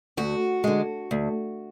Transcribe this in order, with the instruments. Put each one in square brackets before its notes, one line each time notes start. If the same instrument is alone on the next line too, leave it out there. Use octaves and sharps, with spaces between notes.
[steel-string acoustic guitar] D2 F#4
D3 G#3
D2